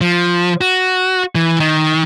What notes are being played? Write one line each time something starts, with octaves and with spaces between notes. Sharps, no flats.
F3
F#4
E3
D#3